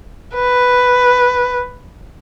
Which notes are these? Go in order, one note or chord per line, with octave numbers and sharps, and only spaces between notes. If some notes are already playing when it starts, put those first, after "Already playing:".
B4